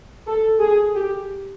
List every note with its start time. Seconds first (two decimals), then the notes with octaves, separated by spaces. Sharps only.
0.26 A4
0.60 G#4
0.94 G4